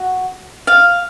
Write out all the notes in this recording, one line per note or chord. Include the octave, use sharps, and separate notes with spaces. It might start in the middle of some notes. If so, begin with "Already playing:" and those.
Already playing: F#4
F5